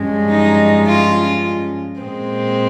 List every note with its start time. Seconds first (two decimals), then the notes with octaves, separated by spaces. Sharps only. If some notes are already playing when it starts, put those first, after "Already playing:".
Already playing: G2 F3 G#3 C#4
0.30 D#4
0.88 F4
2.02 A#2 G#3 C4